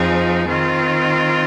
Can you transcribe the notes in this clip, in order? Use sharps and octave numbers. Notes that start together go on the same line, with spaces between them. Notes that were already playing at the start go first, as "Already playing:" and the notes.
Already playing: F2 F3 C4 D#4 G#4
D#3 C4 F4